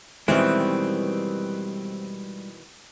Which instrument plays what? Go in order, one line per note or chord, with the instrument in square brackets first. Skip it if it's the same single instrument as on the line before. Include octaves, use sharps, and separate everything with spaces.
[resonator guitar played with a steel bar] B2 D#3 E3 [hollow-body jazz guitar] G3 G#3 [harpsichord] C4